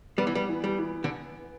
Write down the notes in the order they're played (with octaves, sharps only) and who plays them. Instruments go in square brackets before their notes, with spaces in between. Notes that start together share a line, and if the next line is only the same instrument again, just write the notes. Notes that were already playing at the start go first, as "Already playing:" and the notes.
[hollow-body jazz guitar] G3 [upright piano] B3
[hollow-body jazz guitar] E3
G3
[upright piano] E3
[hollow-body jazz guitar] G3
[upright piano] E3
[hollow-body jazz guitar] D3